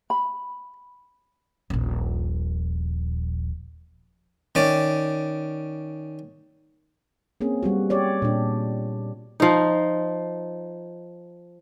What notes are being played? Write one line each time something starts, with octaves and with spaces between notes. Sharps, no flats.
B5
D#1 A#1
D#3 C#4 D5
A#3 C4 C#4 G#4
G3 B3 F#4
G4 C#5 D5
A#2 D4
F3 D#4